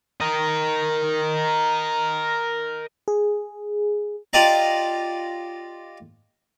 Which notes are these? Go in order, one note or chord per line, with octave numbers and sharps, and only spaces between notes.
A#4 D#5
G#4
F4 G4 D5 D#5 A#5